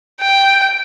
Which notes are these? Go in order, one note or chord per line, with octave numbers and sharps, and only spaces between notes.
G5